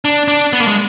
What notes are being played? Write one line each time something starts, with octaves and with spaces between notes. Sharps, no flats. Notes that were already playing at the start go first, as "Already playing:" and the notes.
D4
D4
B3
A#3
G#3